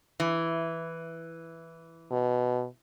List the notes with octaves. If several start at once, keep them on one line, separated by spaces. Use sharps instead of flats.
E3
B2